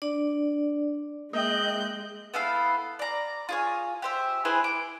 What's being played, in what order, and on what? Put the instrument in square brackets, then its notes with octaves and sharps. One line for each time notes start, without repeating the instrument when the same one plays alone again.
[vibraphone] D4 D5
[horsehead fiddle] G#3 [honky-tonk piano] A#3 E5 G5 [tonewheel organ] D#5 [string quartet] F#6 G6
[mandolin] B3 E4 A4 F5
D5 A#5
F4 G#4 C#5
G4 C5 E5
E4 G#4 B4 C5
D6